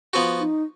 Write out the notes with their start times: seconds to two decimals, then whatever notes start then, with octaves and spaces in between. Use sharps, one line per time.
0.13 F3 B3 F#4
0.39 D#4